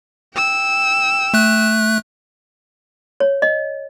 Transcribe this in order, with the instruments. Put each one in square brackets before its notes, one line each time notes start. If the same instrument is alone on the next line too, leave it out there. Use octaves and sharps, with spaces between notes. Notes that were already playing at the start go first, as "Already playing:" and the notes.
[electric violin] G5 E6
[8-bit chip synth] A3 F#6
[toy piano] C#5
D#5